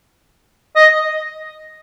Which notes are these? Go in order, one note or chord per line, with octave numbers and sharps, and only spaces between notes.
D#5